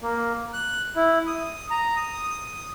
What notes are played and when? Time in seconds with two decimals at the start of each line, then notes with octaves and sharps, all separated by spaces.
0.01 A#3
0.53 F#6
0.96 E4
1.27 D#6
1.71 A#5
1.97 D#6